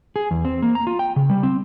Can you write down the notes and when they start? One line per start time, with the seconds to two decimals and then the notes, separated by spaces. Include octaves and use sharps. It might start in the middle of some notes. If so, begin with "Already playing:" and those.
0.16 G#4
0.31 E2
0.45 C4
0.63 A#3
0.75 A#5
0.87 F4
0.99 G5
1.16 C#3
1.30 G3
1.43 C4